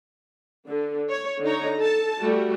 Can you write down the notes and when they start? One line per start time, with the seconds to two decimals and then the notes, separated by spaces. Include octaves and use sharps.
0.67 D3
1.10 C#5
1.42 D3 D#4 C#5 A#5
1.78 A4 A5
2.21 G3 A3 F#4